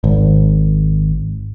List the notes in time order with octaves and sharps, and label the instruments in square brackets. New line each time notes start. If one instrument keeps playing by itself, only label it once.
[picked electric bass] G#1